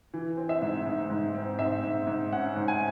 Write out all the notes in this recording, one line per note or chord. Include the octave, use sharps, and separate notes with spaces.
E3
C4
E5
G#2
G#2
G#2
C4
G#2 E5
G#2
G#2
C#4 F#5
G#2
G#5